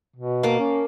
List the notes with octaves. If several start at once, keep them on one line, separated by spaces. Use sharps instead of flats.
B2
A#3 A5 D6
C#4